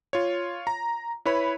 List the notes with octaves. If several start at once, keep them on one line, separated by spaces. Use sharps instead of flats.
F4 C#5
A#5
E4 B4 C#5 B5